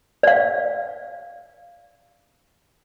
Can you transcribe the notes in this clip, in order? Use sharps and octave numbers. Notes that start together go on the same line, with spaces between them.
D5 F5